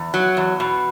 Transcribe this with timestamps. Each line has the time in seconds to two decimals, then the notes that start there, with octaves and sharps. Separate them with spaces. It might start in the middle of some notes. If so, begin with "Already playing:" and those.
Already playing: E2
0.14 F#3
0.37 E2
0.60 B2